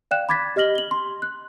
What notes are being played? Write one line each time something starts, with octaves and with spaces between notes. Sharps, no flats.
D5 F5 G5 F#6 E7
B5 D6 G#6 A6 B6
G4 D#5 F6 A#6 F#7 G7
F#7 G7
C6
F#6